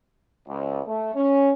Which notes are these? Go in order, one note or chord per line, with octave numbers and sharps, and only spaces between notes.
C#2
A3
C#4